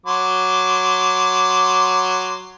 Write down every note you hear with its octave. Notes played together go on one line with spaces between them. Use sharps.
F#3 C6 D6